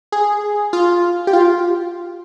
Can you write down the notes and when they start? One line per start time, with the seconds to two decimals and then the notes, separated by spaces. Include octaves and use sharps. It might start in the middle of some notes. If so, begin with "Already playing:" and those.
0.12 G#4
0.73 F4
1.27 G4
1.33 F4